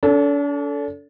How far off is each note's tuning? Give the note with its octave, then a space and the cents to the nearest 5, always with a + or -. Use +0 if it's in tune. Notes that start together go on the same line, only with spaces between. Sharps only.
D4 -45 A4 +0